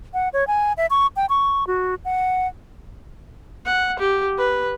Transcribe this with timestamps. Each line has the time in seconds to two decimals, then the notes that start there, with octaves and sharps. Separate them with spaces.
0.14 F#5
0.33 C#5
0.47 G#5
0.77 E5
0.90 C#6
1.16 G5
1.29 C#6
1.67 F#4
2.05 F#5
3.66 F#5
3.99 G4
4.38 B4